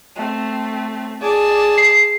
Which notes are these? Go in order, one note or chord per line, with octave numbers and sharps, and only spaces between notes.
A3 C4
G#4 D5 A5
C7